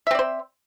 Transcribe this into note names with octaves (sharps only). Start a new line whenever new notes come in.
C4 C5 D5 E5